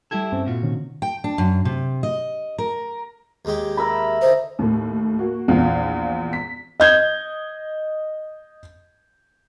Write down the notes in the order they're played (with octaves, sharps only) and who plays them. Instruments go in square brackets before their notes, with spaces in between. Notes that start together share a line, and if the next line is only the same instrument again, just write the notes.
[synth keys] G3 G#6 [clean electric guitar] E4 G4 A4
[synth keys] G2 C4 C#4
[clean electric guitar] A#2 F#4 [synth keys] F4
[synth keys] C3 D#3 C#4
[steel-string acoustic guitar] G5
D4
F#2
C3
D#5
A#4
[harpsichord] D#2 G#3 G4
[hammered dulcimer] A#4 E5 B5
[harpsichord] D3 D#4 [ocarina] C5
[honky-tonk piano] D#2 A2
A#3 F#4
A#1 E2 F4 F5
B6
[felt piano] D#5 G6 G#6